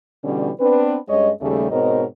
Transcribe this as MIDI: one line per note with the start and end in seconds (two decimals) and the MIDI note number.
0.24 0.50 47
0.24 0.50 50
0.24 0.50 52
0.24 0.50 55
0.24 0.50 61
0.60 0.97 59
0.60 0.97 60
0.60 0.97 62
0.60 0.97 71
1.08 1.31 43
1.08 1.31 56
1.08 1.31 61
1.08 1.31 73
1.08 1.31 75
1.41 1.70 39
1.41 1.70 49
1.41 1.70 55
1.41 1.70 57
1.71 2.04 44
1.71 2.04 47
1.71 2.04 60
1.71 2.04 70
1.71 2.04 73
1.71 2.04 75